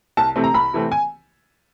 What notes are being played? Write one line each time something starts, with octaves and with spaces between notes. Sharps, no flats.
C2 A5
C3 E3 A3 C4
A#5
C2 B5
C3 E3 A3 C4
G#5